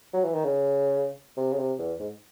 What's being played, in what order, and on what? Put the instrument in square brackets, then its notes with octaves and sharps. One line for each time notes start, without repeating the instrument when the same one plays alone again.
[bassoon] F#3
E3
D#3
C#3
C3
C#3
C3
E2
G#2